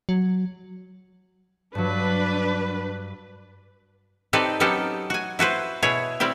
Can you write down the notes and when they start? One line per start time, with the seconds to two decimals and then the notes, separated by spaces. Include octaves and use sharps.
0.09 F#3
1.75 G2 F#3 D4 B4
4.33 C4 D#4 G4 A4 B4 D5
4.60 F#3 B3 C#4 D#4 G4 A4
5.10 F#4 G#5
5.39 E4 F#4 B4 C5
5.83 B2 E4 G#4 C#5
6.20 G3 C4 E4 G4